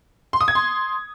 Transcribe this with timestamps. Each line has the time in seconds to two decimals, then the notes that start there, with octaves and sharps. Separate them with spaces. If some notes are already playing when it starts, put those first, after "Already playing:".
0.33 C6
0.41 D#6
0.48 G#6
0.55 C6